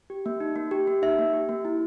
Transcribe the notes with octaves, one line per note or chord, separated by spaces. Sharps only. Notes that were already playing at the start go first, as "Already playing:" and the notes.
G4
A#3
D#4
A#3
G4
A#3
D#4 E5
A#3
G4
A#3
E4